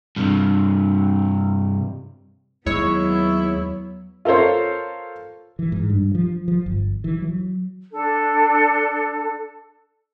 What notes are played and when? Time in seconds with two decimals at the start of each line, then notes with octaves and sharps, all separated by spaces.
0.16 G2 C3
2.66 D#2 F#3 G#3 B3 E4 C#5
4.25 F4 A4 A#4 C5 C#5
5.59 E3
5.72 G#2
5.90 G2
6.15 F3
6.48 F3
6.66 G1
7.04 E3
7.22 F#3
7.91 D4 A4